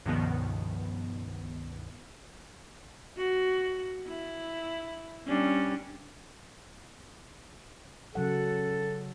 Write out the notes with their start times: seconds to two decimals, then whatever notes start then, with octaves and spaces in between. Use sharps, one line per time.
0.05 C#2 G2 B2 D#3 F3 B3
3.17 F#4
4.08 E4
5.27 G3 C#4 D4
8.15 C#3 F#3 A4 F#5